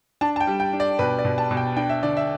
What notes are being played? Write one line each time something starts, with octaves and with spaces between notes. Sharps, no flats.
D4 A5
A5
G5
G3
G5
D4
D5
B2 B4
D5
B2
A5
B2
G5
D4 G5
E5
D3 D5
E5